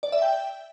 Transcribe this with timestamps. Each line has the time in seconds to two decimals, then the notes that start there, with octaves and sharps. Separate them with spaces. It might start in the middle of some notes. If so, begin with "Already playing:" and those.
0.03 D5
0.12 E5
0.22 G5